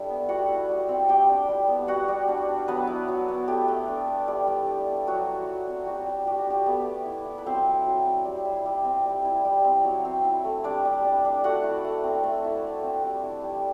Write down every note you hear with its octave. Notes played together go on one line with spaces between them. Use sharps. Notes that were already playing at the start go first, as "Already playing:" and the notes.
Already playing: G3 A3 D4 E4
B3
G3 F#4 F#5
E4
G3
C4
G3 G4 G5
D4
G3
B3
G3 F#4 F#5
G3
D4
D4
F#3 B3 B4
E4
F#3
B3
A3 G4
A3
D4
D4
G3
G3
D4
D4
F#3 F#4
E4
F#3
C4
G3 F#4
G3
D4 G4
F#4
D4 G4
A3 B3 B4
A3
E4
E4
B4
F#3 C4 C5
E4
F#3
C4
G3
E4
G3
C4
G3
E4
G3
C4
F#3
C4
E4
A3
G3 D4 D5
G3
D4
D4
A3 F#4 F#5
E4
A3
C4
A3
E4
A3
C4
G3
E4
G3